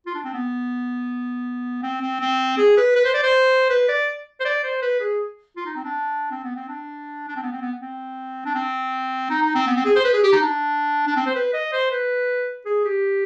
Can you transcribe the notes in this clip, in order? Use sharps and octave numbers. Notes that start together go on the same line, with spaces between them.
F4
D4
C4
B3
C4
C4
C4
G#4
B4
B4
C5
D5
C5
B4
D5
C5
D5
C5
B4
G#4
F4
D#4
C4
D4
C4
B3
C4
D4
D4
C4
B3
C4
B3
C4
D4
C4
D#4
D#4
C4
B3
C4
G#4
C5
B4
G#4
G4
D#4
D4
D4
C4
C5
B4
D#5
C5
B4
G#4
G4